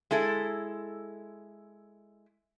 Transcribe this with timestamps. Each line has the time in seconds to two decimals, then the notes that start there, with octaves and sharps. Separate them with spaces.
0.11 G#3 E4 A4